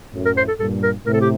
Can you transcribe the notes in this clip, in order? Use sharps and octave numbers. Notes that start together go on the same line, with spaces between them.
F#2 A2
A#4
C5
A4
G2 A#2 A4
A#4
A2 C3 A#4
A4
G4